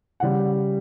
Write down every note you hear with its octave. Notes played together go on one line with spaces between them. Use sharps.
C#3 G3 F#5